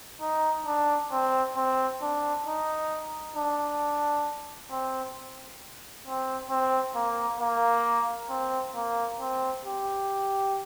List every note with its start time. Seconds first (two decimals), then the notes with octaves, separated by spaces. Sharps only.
0.21 D#4
0.67 D4
1.12 C4
1.57 C4
2.02 D4
2.46 D#4
3.36 D4
4.71 C4
6.06 C4
6.50 C4
6.96 A#3
7.40 A#3
8.30 C4
8.75 A#3
9.20 C4
9.65 G4